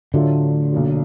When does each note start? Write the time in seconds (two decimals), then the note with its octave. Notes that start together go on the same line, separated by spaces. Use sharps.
0.14 A2 D3 F#3 A3 D4 F4
0.72 B1 A#2 F#3